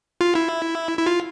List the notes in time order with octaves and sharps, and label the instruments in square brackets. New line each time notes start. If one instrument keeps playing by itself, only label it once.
[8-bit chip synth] F4
E4
E4
F4